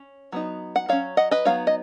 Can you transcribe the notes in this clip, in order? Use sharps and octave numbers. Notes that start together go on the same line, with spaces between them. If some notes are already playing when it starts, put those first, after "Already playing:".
Already playing: C#4
F#3 B3 D#4
F#5
F#3 C#4 C#5 F5
D#5 F#5
B4 D#5
F#3 B3 D#4 C#5 F5
D#5